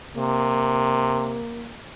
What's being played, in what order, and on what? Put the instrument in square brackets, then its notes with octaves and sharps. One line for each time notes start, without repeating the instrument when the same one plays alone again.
[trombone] C3 [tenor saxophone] A#3